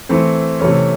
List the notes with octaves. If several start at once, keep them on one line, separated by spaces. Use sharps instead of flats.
E3 A3 C4
C3 E3 A3 C#4